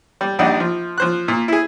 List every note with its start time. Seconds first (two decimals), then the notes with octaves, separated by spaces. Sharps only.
0.21 G3
0.39 A#1 G3 D4 D#4 F#5
0.60 F3
0.98 F3 C5 F#6
1.28 A#2
1.48 E4 G#4